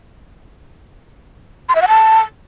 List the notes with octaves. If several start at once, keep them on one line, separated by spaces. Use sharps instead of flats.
C6
E5
F#5
A5